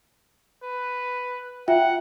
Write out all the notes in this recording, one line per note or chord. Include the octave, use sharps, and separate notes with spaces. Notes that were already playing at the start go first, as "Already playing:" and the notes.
B4
F4 E5 F#5 G5